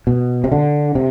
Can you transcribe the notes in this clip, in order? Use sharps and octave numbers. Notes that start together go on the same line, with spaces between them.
B2
C3
D3
C3